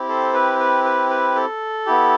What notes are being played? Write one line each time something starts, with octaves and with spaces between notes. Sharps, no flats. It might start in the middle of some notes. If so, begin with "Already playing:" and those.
Already playing: C4 E4 G4
A4 C5
B4
B4
B4
B4
A4
B3 E4 G4